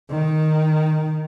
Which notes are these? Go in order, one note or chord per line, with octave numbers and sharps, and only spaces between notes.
D#3